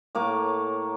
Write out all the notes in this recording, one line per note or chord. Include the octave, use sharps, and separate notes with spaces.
A2 A#3 C#5 D6